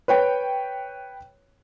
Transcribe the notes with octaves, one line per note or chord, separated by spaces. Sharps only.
B4 C#5 G5